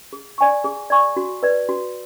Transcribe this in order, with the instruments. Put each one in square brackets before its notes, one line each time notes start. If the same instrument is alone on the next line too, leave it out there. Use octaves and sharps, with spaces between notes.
[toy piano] G#4
D5 G#5 C#6
G#4
D5 G#5 C#6
F#4
B4 D5
F#4